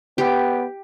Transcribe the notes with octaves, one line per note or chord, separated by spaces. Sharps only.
B3 G4